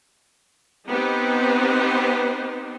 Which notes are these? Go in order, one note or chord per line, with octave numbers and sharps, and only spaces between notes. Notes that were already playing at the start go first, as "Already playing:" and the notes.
B3 C4 D#4 G4 B4 C5